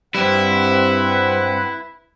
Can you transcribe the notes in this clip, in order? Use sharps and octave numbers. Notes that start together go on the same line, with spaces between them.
G2 G3 C4 E4 G4 B4 F#5